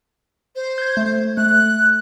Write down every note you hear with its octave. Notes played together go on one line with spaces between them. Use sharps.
C5
G6 G#6
A3
A3 F#6